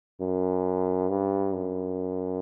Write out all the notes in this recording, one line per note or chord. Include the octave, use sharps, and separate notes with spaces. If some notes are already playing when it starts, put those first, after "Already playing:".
F#2
G2
F#2